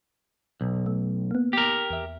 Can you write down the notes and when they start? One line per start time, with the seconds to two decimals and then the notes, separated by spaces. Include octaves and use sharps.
0.61 B1
0.86 A3
1.31 A#3 B3
1.53 G4 A#4
1.91 E2 E5